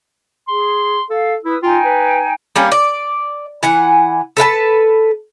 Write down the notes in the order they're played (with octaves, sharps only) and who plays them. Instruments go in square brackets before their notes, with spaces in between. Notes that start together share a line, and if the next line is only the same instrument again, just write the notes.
[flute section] G#4 [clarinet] C6
[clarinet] A4 [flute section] F5
[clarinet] E4 [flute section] B4 D#6 E6
[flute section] D#4 G5 G#5 [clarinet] F4
[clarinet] B4
[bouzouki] G3 A#3 C#4
D5
E3 F#5 G#5
A4 B4 F5 A5